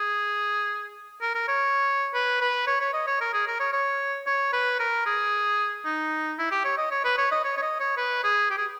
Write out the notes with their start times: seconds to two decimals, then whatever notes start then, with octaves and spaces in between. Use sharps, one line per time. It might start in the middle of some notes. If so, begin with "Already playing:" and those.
Already playing: G#4
1.21 A#4
1.35 A#4
1.48 C#5
2.14 B4
2.41 B4
2.67 C#5
2.81 C#5
2.93 D#5
3.07 C#5
3.21 A#4
3.34 G#4
3.47 A#4
3.60 C#5
3.73 C#5
4.26 C#5
4.53 B4
4.79 A#4
5.06 G#4
5.85 D#4
6.39 E4
6.51 G4
6.65 C#5
6.78 D#5
6.91 C#5
7.04 B4
7.18 C#5
7.32 D#5
7.44 C#5
7.57 C#5
7.62 D#5
7.80 C#5
7.97 B4
8.24 G#4
8.50 G4
8.57 G#4